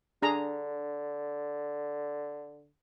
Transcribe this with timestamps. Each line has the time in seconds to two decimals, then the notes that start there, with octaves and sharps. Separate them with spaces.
0.22 D3 D4 G#4 A#5